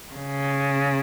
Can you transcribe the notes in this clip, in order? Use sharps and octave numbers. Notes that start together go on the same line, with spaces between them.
C#3